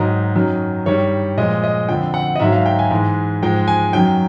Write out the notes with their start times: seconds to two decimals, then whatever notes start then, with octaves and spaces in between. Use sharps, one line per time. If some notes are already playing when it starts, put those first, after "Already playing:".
Already playing: G#2 D#3 F#3 D#5
0.35 F#2 D#3 F#3
0.86 G2 D#3 G3 C#5
1.37 A#2 F3 G#3 D#5
1.64 D#5
1.89 F2 D3 F3 G5
2.14 F#5
2.36 D#5
2.40 G#2 D#3 F#3 E5
2.52 F5
2.66 G5
2.79 G#5
2.91 G#2 E3 G#3
3.43 G#2 F3 G#3 G5
3.68 G#5
3.93 F#2 D#3 F#3 G5